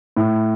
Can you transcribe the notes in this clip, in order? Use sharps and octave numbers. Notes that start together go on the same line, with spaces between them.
A2